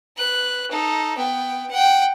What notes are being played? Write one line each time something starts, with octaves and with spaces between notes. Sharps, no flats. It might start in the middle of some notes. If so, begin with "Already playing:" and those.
B4 F#6
D#4 A4
B3 G5
F#5 G5